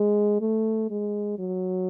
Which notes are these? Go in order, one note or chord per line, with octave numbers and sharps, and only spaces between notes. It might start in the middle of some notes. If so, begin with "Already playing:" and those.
Already playing: G#3
A3
G#3
F#3